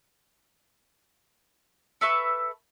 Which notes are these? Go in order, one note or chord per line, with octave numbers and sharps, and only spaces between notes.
A4 B4 E5 C#6